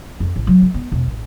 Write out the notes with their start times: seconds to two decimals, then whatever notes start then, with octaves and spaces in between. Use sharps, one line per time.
0.20 F2
0.36 A1
0.47 F#3
0.62 C4
0.74 B3
0.92 E1
1.07 A1